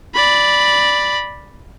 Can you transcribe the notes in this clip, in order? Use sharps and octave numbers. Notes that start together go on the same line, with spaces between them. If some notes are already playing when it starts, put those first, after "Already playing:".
D5 B5